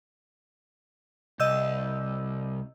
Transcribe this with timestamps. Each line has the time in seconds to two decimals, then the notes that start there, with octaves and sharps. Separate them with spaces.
1.40 C2 D#5 E6 G6